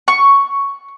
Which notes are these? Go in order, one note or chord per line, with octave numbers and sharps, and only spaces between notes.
C#6